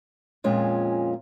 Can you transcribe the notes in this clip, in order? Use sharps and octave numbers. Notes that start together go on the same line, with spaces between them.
F2 A#2 G#3 C#4 F4